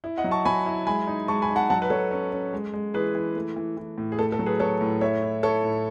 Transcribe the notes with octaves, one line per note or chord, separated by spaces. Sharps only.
E4
D#5 F#5
F#3
A5 C#6
F#3 G#5 B5
E4
G#3 G#5 B5
D#4
G#3 A5 C#6
G#5 B5
D#4
F#5 A5
F#3 F#5 A5
B4
F#3 A4 C#5
C#4
C#4
G#3
G#3
E3 G#4 B4
E3
A3
E3
E3
A2
G#4
A3 A4
A4
F#3
G#4 B4
F#3 A4 C#5
A2
A3 C#5 E5
E4
E4 A4 C#5
A2